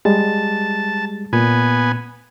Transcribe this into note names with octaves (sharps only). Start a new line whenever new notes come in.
G3 G#3 A5
A#2 B3 G#5